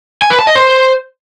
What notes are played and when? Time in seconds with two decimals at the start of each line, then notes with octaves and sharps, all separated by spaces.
0.22 G#5
0.30 B4
0.39 A5
0.47 D#5
0.55 C5